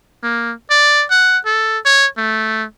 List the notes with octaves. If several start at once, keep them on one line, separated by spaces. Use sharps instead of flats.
A#3
D5
F#5
A4
C#5
A3